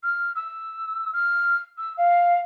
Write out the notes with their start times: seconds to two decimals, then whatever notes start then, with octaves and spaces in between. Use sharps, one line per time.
0.03 F6
0.35 E6
1.13 F6
1.78 E6
1.97 F5